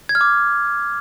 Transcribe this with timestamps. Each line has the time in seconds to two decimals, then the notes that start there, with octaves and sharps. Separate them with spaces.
0.09 G#6
0.15 F6
0.21 D6